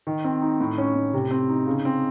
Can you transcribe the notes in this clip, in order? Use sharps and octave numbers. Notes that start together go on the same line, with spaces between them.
D#3
C4
D#4
A2
C#4
A2
C3
C4
D#4
C#3
C4